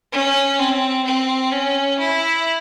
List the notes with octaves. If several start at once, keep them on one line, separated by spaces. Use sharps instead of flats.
C#4
C4
C4
C#4
E4